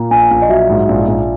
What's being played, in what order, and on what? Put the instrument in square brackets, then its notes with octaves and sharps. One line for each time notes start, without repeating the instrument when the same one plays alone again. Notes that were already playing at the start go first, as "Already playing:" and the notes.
Already playing: [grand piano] A#2 [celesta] A#5
[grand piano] A#1 [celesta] G#5
[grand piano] A#1
[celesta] D#5
[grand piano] F#3 [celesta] E5
[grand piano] G#2
A#1
A#1